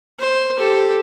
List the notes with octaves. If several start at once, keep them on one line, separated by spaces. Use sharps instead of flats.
C5
G4 A4